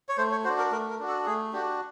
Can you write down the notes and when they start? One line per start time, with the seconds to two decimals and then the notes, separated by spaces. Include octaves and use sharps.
0.09 C#5
0.17 A3 C5
0.31 C#5
0.44 F#4 C5
0.49 D4
0.58 A#4
0.71 A3 A#4
0.90 A#4
0.99 D4 F#4
1.08 A4
1.26 A3 G#4
1.53 D4 F#4 G4